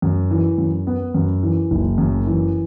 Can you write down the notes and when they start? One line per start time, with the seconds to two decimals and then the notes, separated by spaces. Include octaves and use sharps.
0.02 F#2
0.31 E3
0.58 F#2
0.87 B3
1.14 F#2
1.43 E3
1.71 F#1
1.98 F#2
2.27 E3